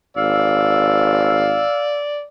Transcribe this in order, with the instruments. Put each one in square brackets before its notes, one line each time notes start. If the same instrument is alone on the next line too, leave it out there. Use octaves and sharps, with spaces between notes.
[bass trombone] G#1 [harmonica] D5 [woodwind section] F5 E6